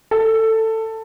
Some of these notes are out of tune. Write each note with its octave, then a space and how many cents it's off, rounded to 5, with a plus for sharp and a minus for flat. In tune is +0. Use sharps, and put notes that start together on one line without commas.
A4 +15